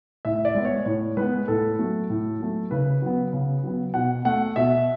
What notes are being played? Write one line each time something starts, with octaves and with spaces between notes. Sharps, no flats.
A2 E5
D5
G#3 B3
C#5
A2 C#5
G#3 B3 B4
A2 A4
F#3 A3
A2
F#3 A3
C#3 B4
F#3 B3
C#3
F#3 B3
B2 F#5
A3 F#5
B2 E5